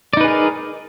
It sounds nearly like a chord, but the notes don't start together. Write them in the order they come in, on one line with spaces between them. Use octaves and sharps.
D5 D#4 B4 G#4 A#4